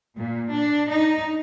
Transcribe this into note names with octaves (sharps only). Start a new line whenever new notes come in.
A#2
D4
D#4